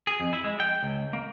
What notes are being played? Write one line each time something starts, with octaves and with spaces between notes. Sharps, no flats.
G#4
F2
E4
G#3
G5
C#2
A#3